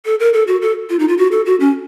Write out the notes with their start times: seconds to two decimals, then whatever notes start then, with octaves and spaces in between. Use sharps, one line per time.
0.05 A4
0.20 A#4
0.33 A4
0.47 F#4
0.62 A4
0.90 F4
0.99 D#4
1.08 F4
1.18 F#4
1.32 A4
1.46 F#4
1.60 C#4